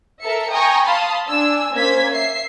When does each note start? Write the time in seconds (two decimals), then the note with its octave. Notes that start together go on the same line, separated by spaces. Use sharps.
0.22 A4 A#4 E5 C#7
0.52 G5 G#5 A#5 C#6 D#6
0.85 F5 A5 B5 C6 D#6
1.28 D4 G#5 E6
1.74 A#3 C#4 C5 G#6 B6
2.12 E5 C7